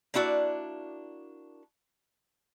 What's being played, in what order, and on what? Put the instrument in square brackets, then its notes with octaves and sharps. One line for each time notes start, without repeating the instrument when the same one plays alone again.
[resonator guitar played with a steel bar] A#3 D4 E4 F#4 D5